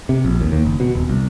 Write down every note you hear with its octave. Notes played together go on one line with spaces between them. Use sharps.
C3
A#1
D#2
D#2
F#1
B2
D#1
C2